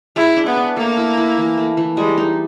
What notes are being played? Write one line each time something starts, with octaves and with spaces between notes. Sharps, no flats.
G#3 E4
D4
B3
D4
A3 A#3
E4
E4
E3
A3
E3
G3 G#3
D#4